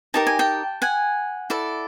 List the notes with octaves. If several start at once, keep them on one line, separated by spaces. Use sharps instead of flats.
D#4 G4 A#4 A5
G#5
G5 A5
F#5 G#5
E4 A4 D5